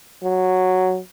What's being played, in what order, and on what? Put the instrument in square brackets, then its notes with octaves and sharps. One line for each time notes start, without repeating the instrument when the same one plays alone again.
[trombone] F#3